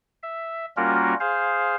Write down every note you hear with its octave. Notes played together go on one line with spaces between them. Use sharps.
E5
G3 A#3 C#4 F4 F#4 A#4
G#4 C5 F5